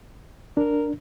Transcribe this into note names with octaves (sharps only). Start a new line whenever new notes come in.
D4 A#4